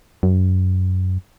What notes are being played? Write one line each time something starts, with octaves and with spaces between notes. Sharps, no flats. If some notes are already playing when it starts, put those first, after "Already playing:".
F#2